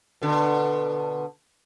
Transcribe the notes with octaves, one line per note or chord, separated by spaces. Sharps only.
B2 D3